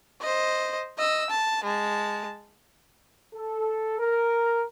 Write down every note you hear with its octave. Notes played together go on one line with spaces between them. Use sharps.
C5 D#5
D#5 E6
A5
G#3 A5
A4
A#4